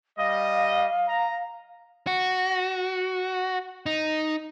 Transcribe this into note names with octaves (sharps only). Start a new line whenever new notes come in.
G3 D#5 F5
A#5
F#4
D#4